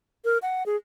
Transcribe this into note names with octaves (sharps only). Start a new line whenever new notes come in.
A#4
F#5
G#4